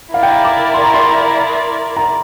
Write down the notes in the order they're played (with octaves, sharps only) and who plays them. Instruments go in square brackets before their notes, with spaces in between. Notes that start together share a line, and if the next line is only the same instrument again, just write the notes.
[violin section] E4 A#4 D5 [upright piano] F5
[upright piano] G5
F5
D6
C6
A#5
C6
A#5